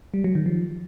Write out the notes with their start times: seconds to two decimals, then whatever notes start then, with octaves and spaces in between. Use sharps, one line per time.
0.14 G3
0.24 F#3
0.35 D#3
0.46 F3